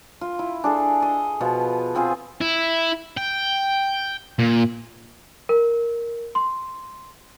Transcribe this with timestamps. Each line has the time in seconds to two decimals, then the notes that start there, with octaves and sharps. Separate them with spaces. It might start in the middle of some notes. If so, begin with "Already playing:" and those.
0.21 F4
0.39 E4
0.64 D4 G#4 A4
1.02 D#5
1.41 B2 F3 B3 F4
1.95 B3 C4 F4 G#4
2.41 E4
3.17 G5
4.39 A#2
5.49 A#4
6.35 C6